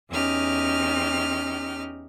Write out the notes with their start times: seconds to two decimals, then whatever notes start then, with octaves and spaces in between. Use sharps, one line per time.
0.10 E2 C#4 D#4 G4 F6